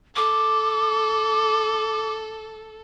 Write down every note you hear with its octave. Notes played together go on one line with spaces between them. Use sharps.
A4 D6